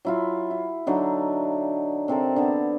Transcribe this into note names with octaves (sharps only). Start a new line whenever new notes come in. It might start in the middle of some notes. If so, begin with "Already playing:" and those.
F#3 E4 F4
E4
D3 F#3 D#4
C3 C4 A4 A#4
D3 B3